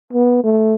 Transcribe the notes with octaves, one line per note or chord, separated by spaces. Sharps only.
B3
A3